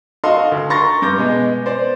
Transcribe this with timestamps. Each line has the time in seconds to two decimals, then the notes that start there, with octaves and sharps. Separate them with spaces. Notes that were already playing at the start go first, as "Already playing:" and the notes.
0.24 F#4 A4 D#5 F5 C6
0.52 D2
0.70 A#5 C6 C#6 A6 A#6
1.02 G2 D6 G6 A#6
1.18 B2 G#3
1.65 B3 C5 D5